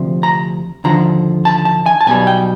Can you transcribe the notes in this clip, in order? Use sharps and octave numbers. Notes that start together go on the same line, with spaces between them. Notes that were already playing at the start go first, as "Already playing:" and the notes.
Already playing: D2 C3 F3
A#5
D#2 D3 F3 A#5
A5
A5
G#5
A5
B1 B2 G3 G#5
G5